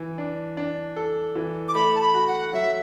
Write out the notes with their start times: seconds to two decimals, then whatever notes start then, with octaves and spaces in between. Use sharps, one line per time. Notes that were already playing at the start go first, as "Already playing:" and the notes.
Already playing: E3
0.18 D4
0.57 D4
0.96 A4
1.36 E3
1.68 D6
1.75 A3 B5
1.95 A5
2.01 B5
2.14 F#4
2.28 F#5
2.53 F#3 E5